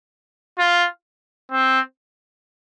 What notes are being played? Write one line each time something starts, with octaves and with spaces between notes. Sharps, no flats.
F4
C4